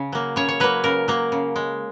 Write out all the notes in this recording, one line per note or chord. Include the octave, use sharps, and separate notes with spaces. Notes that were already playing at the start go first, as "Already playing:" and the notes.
Already playing: C#3
F#3 A#3
C#3 C#5
C#5
F#3 A#3 B4
C#3 A#4
F#3 A#3
C#3
G#3